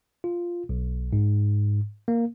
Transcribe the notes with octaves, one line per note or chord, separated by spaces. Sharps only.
F4
B1
G#2
A#3